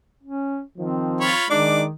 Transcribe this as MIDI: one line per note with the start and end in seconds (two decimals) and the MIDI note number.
0.23 0.61 61
0.78 1.32 51
0.78 1.32 53
0.78 1.35 60
1.21 1.45 65
1.21 1.45 73
1.21 1.45 83
1.50 1.94 51
1.50 1.86 56
1.50 1.82 62
1.50 1.86 63
1.50 1.82 86